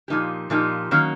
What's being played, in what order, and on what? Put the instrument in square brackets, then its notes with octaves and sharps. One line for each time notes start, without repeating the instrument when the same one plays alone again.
[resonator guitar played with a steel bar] A#2 F3 A#3 D#4 G4
A#2 F3 A#3 D#4 G4
D#3 F#3 A#3 C#4